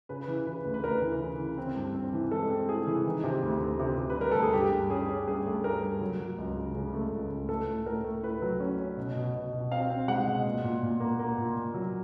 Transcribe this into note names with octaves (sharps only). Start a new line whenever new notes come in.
C#3 B4
E3
C#3 B4
D2
B4
D2 A#4
E3
C#3
E3
C4
G2
C4
E3
G#3 A4
C4
E3 G#4
E3
D#3
C3
D2
D2
C3
C3
B4
G3 A#4
D2 A4
G#4
G2 G4
G2
C#4 G#4
C#4
G2 G#4
A3
G2 A#4
G2
F#3
F#3
C#2
C#3
C#3
A3
C#2
C#2
A3 A4
A2
A2 A#4
A3
A2 B4
F#3
C#4
C#4
B2
B2
B2
B2
C4 F5
C4
G#3 F#5
B2
A#2
A#2
A#2
A#3
A#3
A#2
A#2
F#3